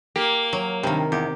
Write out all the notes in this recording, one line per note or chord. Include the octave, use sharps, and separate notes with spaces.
A#3 G4
F#3
G2 C3 D#3
E2 G4